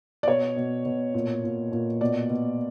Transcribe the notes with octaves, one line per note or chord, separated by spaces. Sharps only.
D5
B2 C#5
B2
B2
A#2
A#2
A#2
B2 D5
B2